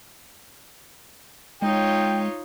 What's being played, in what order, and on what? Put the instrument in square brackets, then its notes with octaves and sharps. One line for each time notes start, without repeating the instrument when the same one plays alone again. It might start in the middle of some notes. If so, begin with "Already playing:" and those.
[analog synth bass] G#3 [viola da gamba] D#4 F4 C#5 [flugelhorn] G5